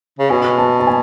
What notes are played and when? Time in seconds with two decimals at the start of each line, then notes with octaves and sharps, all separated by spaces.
0.19 C#3
0.30 B2 G#5
0.58 A5
0.80 A5
0.87 G#5